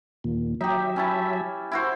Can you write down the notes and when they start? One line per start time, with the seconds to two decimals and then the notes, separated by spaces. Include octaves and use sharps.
0.24 D#2 A#2
0.61 F#3 D#4 G4 E5
0.96 C#4 E4 A5
1.72 E4 F#4 C5